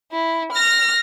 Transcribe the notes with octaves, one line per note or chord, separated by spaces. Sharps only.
E4
F6 A#6